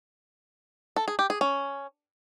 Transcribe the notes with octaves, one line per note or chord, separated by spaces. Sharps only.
A4
G#4
G4
G#4
C#4